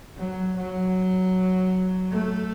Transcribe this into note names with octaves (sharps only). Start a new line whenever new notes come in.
F#3
F#3
A3